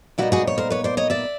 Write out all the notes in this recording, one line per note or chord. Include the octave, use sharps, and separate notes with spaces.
A#2 G3 B3 D#4 E4 F#4
F#4 G#4
C#5
A#4 C5
B4 C#5
C5 D5
C#5 D#5
D5 E5